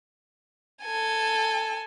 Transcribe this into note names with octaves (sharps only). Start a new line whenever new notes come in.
A4 G#5